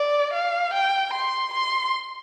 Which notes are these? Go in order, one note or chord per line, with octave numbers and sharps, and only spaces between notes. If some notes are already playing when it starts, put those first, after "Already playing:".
Already playing: D5
F5
G5
C6
C6